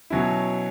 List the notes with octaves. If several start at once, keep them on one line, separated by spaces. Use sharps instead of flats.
B2 F#3 C#4 E4